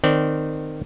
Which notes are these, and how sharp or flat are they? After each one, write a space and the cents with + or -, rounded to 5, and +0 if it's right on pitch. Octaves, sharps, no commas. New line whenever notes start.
D#3 -20 C4 -25 D5 -20